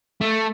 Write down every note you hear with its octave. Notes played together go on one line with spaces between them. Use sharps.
A3